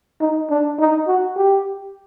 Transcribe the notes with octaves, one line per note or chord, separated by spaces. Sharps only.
D#4
D4
D#4
F#4
G4